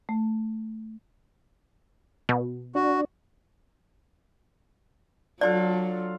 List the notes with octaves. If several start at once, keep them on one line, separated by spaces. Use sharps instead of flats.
A3
B2
D4 F#4
F#3 D4 F4 A4 D5